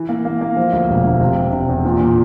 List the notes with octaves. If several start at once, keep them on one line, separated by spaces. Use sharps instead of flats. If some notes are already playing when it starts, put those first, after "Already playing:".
Already playing: E3
A#3
A#3
A#3
F3
D2
E1
D2
C3
E1
C3
E2
A#2
A#2